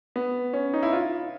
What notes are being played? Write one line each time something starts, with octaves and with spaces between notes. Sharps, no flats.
B3
C#4
D#4
E4
F4